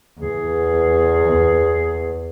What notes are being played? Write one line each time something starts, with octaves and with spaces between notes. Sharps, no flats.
E2 G#4